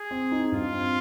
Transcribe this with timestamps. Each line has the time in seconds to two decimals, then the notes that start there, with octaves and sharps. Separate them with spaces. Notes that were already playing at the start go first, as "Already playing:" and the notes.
Already playing: G#4
0.11 C4
0.32 D#4
0.52 G2 F4
0.73 C4